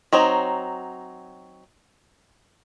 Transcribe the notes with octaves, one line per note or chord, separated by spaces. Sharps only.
F#3 C4 D#4 C#5